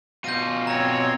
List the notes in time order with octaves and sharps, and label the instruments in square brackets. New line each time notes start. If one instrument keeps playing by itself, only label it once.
[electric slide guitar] B2 F4 [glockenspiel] G6 A#6 D#7
[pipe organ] C4 C#5 [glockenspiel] A#5 A#6